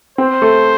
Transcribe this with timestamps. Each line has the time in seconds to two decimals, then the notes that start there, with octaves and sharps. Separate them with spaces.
0.18 C4 C5
0.42 A3